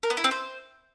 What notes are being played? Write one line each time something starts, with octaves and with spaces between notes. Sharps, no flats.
A#4
B3
E4
C4
C5